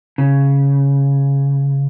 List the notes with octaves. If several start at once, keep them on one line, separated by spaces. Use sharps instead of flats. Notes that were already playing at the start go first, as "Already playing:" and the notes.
C#3